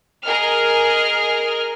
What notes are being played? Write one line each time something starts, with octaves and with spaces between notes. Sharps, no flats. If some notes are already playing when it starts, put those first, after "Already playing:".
G#4 A#4 D#5 F6